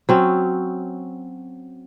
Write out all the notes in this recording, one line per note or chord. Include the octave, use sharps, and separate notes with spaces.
F#3 C4 C#4